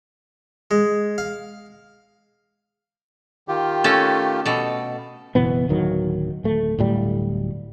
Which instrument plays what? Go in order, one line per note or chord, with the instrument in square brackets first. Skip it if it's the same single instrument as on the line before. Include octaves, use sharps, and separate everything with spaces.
[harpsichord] G#3
F5
[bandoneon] D#3 F4 G4
[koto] A3 C#4 A4
B2 A4
[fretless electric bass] F#1 B2 E3 B3
D1 D#3 F#3
D1 A3
D1 A2 G3